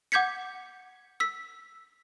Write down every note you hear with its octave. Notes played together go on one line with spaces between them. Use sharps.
F#5 D6 G6 G#6 B6 C#7
E6 B6